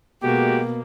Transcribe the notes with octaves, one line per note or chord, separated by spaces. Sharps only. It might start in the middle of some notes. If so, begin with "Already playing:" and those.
B2 G#3 A#3 F#4 G4